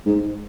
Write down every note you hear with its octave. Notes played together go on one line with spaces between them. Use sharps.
G#2